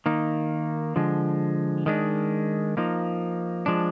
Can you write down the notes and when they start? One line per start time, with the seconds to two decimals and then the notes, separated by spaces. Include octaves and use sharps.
0.06 D#3 A#3 D#4
0.96 D3 F3 G#3
1.86 D#3 G#3 D4
2.77 F3 A#3 D#4
3.66 F3 G#3 D4